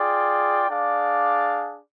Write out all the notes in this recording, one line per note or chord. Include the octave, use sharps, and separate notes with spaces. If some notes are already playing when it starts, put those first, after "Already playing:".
Already playing: F4 G#4 D5 G5
D4 G#4 D5 F5